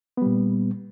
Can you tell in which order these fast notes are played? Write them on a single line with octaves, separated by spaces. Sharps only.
B3 G3 A#2